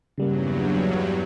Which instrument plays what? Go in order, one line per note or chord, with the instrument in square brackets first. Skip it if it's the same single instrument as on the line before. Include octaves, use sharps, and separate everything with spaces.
[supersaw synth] E2 G2 F#3 [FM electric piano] C#3 G3 A#3